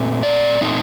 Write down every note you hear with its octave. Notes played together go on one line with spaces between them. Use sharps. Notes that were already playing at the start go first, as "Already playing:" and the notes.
Already playing: A#2 A3 C4
D5
A#2 A3 C4 D#4